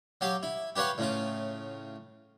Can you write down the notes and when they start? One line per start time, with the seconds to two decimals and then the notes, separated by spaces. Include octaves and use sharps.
0.21 F#3 G4 F5
0.43 E4
0.76 G4 B4 C#5 F5 F#5
0.98 A2 C#3 F4